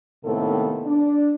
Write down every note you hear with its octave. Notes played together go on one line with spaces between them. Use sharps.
A2 C3 D#3 A#3 B3 A4
D4